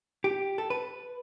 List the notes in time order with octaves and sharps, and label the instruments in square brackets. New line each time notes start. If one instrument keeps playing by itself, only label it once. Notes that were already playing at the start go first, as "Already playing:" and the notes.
[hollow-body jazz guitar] G4
A4
B4